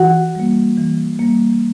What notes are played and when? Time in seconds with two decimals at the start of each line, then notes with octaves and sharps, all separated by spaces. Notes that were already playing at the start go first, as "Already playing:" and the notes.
Already playing: E3 F#4 F#5
0.35 G3 A#3
0.77 E3
1.19 G3 A#3